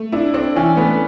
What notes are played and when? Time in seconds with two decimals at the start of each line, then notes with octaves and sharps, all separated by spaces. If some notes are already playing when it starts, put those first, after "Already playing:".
Already playing: A3
0.12 D4 E4
0.34 C4 D4
0.56 E3 C#4
0.77 A3 B3